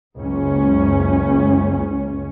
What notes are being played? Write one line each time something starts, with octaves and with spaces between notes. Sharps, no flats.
F#1 C#2 C#4